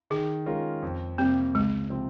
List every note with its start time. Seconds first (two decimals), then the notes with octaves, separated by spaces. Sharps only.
0.10 D#3 G#4
0.46 G#3 C#4 F4 A#4
0.82 F2
1.18 C3 G3 A#3 C4
1.55 C#2 G#3
1.90 C3 F3 C4